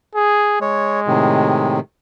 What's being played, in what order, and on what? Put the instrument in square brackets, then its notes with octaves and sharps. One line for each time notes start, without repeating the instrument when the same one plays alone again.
[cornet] G#4
[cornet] G#3 [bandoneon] C#5
[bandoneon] A2 C3 D#3